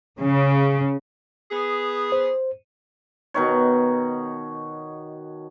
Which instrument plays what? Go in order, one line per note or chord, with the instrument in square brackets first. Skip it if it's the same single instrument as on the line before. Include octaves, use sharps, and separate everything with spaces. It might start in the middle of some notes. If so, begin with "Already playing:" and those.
[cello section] C#3
[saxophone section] B3 G#4
[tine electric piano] C5
[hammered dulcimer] B2 D#3 C#5